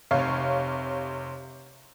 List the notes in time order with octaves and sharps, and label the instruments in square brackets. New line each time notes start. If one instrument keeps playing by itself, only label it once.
[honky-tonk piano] F1 C3 C#5 F5